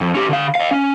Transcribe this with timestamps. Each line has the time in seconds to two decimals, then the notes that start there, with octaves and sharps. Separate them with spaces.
0.01 F2
0.15 C#4 G4
0.29 D3 F5
0.55 D#5 F5
0.71 C#4